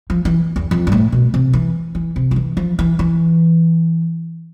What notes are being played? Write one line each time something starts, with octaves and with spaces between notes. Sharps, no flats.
F3
E3
E2
F2
G2
A2
B2
C3
E3
E3
C3
F3
E3
F3
E3
E3